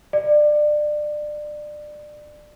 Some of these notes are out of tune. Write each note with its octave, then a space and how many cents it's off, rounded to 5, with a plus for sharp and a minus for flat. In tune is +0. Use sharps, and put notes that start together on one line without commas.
D5 +25